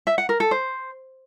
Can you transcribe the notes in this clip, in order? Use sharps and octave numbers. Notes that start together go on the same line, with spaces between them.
E5
F#5
A#4
A4
C5